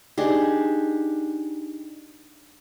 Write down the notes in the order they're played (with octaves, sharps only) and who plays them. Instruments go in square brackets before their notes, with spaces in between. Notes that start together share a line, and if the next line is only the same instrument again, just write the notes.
[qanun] D4 D#4 G4 G#4